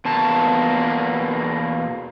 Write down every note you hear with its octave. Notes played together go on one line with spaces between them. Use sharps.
E2 B2 A#3 A5